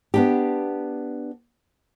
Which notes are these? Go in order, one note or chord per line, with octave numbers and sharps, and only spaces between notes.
B3 D4 G4